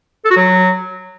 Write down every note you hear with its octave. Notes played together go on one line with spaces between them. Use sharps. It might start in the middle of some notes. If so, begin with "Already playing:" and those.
A4
F#4
F#3